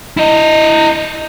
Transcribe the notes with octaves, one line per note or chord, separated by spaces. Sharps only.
E4 D#5